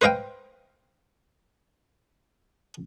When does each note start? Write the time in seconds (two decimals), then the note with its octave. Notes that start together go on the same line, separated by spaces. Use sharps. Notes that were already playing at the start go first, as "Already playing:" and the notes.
0.01 B4 C5 D#5 F5 G5